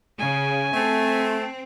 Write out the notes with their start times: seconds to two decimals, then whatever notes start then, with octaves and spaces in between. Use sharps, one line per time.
0.19 C#3 G#5
0.74 A3 C4